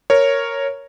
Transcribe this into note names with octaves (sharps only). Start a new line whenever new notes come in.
A#4 C#5